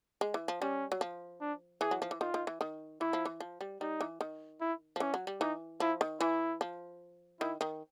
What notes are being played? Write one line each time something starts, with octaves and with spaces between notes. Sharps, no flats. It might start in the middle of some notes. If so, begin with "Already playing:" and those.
G#3
E3
F3
G3 C#4
F#3
F3
D4
E3 G#4
F#3
F3
E3
D#3 F4
D#3
E3
D#3
E3 E4
F3
E3
F3
G3
G3 D#4
E3
D#3
E4
F3
E3 C#4
F#3
G3
E3 D#4
F3 E4
D#3
E3 E4
F3
D#3 E4
D#3